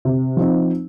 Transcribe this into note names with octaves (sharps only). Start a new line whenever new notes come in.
C3
F3 C4 D#4